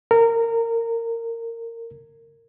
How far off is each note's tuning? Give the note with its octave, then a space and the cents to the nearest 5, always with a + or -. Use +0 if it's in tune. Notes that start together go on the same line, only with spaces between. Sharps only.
A#4 -20